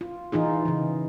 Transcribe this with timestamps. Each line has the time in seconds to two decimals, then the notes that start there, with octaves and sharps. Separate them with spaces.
0.01 F4
0.32 E3 D#4 F4 G#4
0.65 C#3 E3